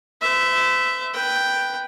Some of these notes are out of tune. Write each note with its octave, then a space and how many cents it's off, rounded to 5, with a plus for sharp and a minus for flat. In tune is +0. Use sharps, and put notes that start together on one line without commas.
C5 -45 E5 +0
B4 +0 G5 +0